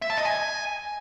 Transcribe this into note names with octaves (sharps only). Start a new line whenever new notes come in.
E5
A5
D#5
G#5